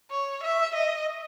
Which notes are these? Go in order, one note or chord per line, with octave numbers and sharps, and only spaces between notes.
C#5
E5
D#5